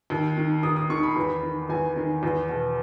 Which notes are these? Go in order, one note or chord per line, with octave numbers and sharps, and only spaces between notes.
D#2
D#3
D#2 D#6
D#6
D#3 C#6
B5
E2
D#3
E2 G#5
D#3
E2
B2